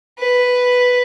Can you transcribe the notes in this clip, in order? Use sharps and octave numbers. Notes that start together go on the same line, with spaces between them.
B4